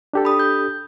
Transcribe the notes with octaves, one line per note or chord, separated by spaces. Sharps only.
D4 G4 A4
B5 D#6
G6